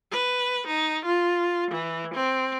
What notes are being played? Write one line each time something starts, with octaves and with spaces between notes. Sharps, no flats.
B4
D#4
F4
E3
C4